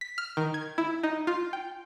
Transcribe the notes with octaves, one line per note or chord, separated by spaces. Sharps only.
B6
F6
D#3
G#6
E4
D#4
F4
G5